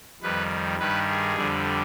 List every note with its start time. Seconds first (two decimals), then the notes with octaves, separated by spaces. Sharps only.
0.22 F2 D#3 G3 B4
0.79 G2 D#3 G3 B4
1.07 G#4
1.36 F2 D3 G3